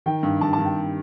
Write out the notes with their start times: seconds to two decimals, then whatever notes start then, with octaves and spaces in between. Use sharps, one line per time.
0.06 D#3 G5
0.23 G2
0.41 G2 A5
0.53 A5
0.59 G2
0.65 G5